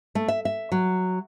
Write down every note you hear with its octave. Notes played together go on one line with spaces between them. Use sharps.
A3
E5
E5
F#3